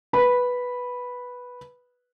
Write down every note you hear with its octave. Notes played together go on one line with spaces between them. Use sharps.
B4 B5